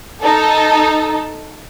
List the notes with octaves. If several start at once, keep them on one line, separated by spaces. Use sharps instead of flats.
D#4 A4